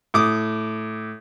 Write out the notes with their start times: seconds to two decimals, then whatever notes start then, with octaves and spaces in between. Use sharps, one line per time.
0.14 A2 D6 D#6